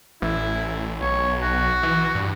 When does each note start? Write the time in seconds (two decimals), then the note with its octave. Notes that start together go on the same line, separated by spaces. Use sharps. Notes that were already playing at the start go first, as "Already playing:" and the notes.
0.22 A1 E4
1.01 B1 C#5
1.41 F#4
1.83 E3
2.15 G2